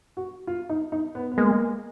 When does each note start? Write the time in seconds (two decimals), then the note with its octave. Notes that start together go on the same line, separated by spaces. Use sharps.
0.17 F#4
0.47 F4
0.69 D#4
0.92 D#4
1.15 B3
1.32 B3
1.38 G#3 A#3